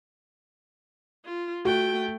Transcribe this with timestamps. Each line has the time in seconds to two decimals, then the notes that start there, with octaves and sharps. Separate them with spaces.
1.25 F4
1.65 A3 F#4 G5